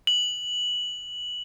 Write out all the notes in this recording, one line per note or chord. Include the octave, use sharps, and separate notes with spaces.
F#7